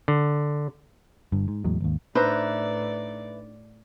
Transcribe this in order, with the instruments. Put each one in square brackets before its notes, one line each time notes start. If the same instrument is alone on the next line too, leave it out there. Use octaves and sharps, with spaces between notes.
[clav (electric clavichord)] D3
[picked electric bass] G1 G2
G#2
E2 A2 F#3 G#3
G#1 D#2
[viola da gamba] A2 D5 [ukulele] D4 D#4 C5 [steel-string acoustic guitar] B4 E5 A#5